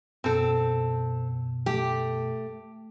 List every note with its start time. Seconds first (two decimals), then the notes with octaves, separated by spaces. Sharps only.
0.24 F#2 B2 C4 A4
1.66 A3 G4